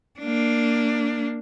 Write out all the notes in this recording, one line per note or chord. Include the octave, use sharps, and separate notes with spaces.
A#3 D4